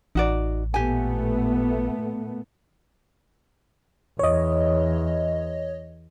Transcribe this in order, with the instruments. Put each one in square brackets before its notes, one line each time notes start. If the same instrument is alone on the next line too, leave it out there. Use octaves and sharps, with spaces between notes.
[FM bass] A1 [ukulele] D#4 F#4 D5
[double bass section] A#2 A3 B3 [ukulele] G4 G#5
[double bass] E2 [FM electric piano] C#5 D#5